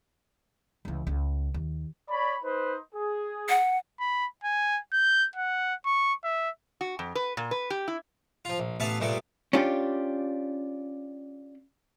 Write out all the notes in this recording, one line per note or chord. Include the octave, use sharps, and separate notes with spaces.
C#2 E3
C#2
D#2
C#5 D5 B5
D#4 B4 C5
G#4
F#5
B5
G#5
G6
F#5
C#6
E5
F#4
F2
B4
A#2
B4
G4
E4
F3 F4
A#1
A1 B3 B4 E5 F5 A5
G2 A#2 A3 B3 D5
C#4 D4 F4 G4